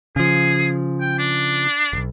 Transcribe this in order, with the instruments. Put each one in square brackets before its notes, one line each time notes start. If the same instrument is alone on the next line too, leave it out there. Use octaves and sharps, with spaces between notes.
[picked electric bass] C#3 F3 [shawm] G#4
[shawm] G5
D4
[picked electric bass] E1 B1